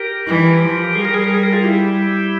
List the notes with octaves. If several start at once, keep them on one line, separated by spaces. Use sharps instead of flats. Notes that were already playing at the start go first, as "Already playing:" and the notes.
Already playing: G4 A#4
E3
F3
G3 G#4
A#4
G#4
A#4
G#4
A#4
F4 G#4
E4 G4